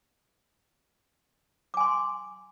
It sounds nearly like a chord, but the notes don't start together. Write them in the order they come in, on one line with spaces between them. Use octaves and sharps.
D6 G#5 C6